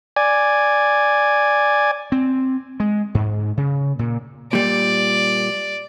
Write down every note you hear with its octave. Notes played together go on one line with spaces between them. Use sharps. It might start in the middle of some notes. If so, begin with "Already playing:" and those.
D5 G#5
C4
G#3
G#2
C#3
A#2
A#2 G3 D5